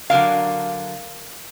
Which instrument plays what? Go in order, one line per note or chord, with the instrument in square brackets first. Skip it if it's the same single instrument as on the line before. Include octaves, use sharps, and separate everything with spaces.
[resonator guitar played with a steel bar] D3 F#3 A#4 F5